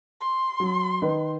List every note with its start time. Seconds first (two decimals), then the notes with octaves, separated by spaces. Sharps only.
0.21 C6
0.60 F#3
1.02 D#3 D#4 B4